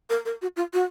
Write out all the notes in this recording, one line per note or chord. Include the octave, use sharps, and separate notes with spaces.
A#4
A#4
F#4
F4
F#4